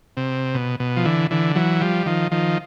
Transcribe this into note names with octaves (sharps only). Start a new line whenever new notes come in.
C3
B2
B2
F3
D3 E3
D3 E3
E3 F#3
F3 G3
D#3 F3
D#3 F3